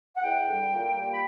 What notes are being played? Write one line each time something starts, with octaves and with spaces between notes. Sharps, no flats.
F#5
E2 G5
D3 G3
A#2
G3 A#3
B5